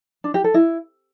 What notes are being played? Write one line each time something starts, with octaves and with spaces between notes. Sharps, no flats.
D4
G4
A4
E4